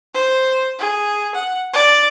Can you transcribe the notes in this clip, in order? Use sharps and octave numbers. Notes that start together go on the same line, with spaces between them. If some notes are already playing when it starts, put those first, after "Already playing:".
C5
G#4
F#5
D5